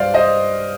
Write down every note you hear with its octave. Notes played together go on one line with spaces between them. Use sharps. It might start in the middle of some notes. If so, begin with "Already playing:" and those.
Already playing: G2 C5 D5 F5
C5 D#5